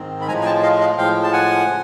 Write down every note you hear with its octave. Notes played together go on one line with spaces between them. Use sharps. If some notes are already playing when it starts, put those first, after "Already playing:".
Already playing: G#2 D#3 C4
B5
A2 F3 G#3 G#5 A#5
G#5
G5 A5
D#5 F5
D#5 F5
A2 F3 G#3 F5 G5
A5
F#5 G#5
C#3